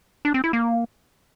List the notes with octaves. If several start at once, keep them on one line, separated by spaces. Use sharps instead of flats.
D4
C4
E4
A#3